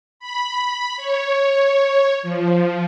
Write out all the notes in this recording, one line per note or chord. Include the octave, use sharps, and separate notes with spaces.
B5
C#5
F3